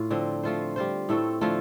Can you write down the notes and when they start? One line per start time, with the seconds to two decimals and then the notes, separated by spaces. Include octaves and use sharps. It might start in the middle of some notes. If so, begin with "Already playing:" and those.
Already playing: A2 F4
0.11 D3 F3 C4
0.43 F3 A3 F4 C5
0.76 G3 F4 C5
1.09 A2 A3 C4 A4
1.41 D3 F3 A3 F4